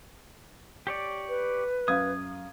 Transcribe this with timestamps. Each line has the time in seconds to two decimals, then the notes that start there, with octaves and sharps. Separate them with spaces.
0.87 G4 C#5 D5
1.29 B4
1.88 F#2 F5 D#6 G#6